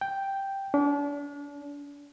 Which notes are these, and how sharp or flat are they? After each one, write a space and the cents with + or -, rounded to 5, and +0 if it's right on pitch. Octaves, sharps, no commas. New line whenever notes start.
G5 +0
D4 -40